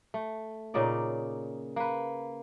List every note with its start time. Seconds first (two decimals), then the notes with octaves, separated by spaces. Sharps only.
0.14 A3
0.74 A#2 C#3 D#4 D5
1.76 A#3 B4